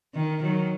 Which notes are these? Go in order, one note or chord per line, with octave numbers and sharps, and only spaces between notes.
D#3
D#3 F#3